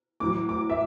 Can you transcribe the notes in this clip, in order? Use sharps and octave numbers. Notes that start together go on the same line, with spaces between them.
A2 F#3 D6
D6
E5